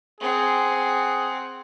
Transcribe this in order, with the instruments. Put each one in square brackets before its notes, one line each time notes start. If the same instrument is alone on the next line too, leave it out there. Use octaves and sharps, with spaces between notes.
[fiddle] C4 F#5 [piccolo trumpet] G#4